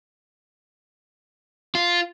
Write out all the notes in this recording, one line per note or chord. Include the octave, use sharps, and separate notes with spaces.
F4